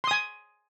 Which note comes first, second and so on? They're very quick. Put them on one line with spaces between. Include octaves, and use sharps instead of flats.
C6 D#6 G#5